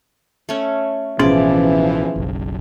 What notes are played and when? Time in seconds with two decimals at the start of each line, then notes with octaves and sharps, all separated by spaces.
0.49 A3 C#4
1.19 A1 B2 E3 F3 C#4 G#4 D5 C6
2.16 F#1 B1